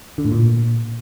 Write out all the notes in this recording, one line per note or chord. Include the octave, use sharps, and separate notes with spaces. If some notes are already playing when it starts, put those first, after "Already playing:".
D3
A2
A#2